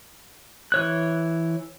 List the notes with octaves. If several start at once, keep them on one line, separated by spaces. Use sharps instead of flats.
E3 C#5 F#6